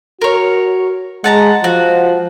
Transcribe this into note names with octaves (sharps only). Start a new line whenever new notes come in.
F#4 A#4 C#5
G#3 F#5 A5 A#5
F3 F#4